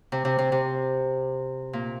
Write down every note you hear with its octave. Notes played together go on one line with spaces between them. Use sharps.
C3
C3
C3
C3
A#2